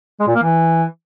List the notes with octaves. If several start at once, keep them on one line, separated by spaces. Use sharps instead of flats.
G#3
A#2
A#3
E3